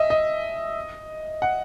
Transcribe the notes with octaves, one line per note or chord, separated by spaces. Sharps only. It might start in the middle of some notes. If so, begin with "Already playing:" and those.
Already playing: D#5 E5
D#5
F#5